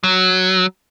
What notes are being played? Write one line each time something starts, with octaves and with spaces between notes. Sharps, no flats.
F#3